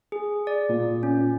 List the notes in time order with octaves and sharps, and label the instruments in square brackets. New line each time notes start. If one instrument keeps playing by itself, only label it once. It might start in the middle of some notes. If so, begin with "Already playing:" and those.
[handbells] G#4
D5
[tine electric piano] A#2
[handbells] C#4